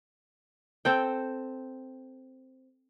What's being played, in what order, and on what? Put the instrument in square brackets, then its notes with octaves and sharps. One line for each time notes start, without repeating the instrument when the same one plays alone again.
[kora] C4 A4 G5